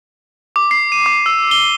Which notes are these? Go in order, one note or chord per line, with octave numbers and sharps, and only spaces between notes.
D6
C7
D#7
D6
E6
G7